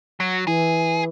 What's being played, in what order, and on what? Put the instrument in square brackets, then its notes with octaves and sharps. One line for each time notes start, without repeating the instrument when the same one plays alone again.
[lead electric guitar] F#3
[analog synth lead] E3 [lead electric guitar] G#4